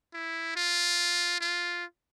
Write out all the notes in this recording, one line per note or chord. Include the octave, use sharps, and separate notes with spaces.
E4
F4
F4